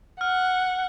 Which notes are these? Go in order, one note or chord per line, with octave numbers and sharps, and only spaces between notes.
F#5 F6